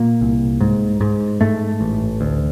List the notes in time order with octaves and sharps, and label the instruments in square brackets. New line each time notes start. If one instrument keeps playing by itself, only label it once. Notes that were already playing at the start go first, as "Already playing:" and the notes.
Already playing: [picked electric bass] A#2 A#3
C2
G#2
G#2
G#2 A3
A1
D2